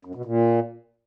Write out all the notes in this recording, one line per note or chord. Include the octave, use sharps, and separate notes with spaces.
F#2
B2
A#2